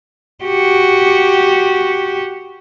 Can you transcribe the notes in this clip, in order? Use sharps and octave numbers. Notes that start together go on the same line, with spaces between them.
F#4 G4